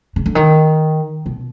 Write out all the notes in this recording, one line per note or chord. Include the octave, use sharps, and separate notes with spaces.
C#3
D3
D#3
B2